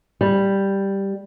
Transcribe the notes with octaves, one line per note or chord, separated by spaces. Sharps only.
G3